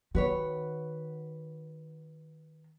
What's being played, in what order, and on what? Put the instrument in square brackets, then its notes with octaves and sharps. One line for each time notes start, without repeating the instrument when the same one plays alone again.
[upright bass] D#3 [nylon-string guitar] F#4 B4 C#5